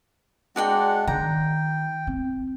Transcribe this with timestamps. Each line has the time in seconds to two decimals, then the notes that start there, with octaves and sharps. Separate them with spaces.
0.56 G#3 D4 F#4 D5 F#5 G5
1.07 D#3 G5 A#5
2.07 C4